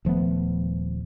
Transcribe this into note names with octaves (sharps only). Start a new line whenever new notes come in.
D#1 F3 A3 B3